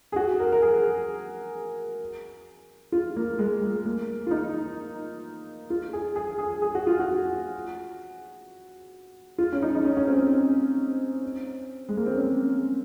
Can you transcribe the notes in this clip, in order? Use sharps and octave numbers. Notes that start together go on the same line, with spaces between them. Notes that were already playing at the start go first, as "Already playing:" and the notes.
G#4
F#4
A#4
A#4
G#4
F4
A#3
G#3
G#3
A#3
F4
D#4
F4
G#4
G#4
G#4
G#4
F#4
F4
F#4
F4
C#4
D#4
D#4
C#4
C#4
C4
G#3
A#3
C4
C#4